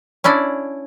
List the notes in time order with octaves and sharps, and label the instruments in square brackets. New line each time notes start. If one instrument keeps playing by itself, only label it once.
[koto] C#4 D4 E4 D5